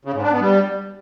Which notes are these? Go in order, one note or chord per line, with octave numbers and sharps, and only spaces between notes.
C#3
G#2
D4
B3
G3